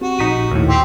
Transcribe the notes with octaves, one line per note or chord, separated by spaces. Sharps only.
C4 F#4 G4
A#1 A#2 D#4 B6 C#7 D#7
D#2 A2
C4 G4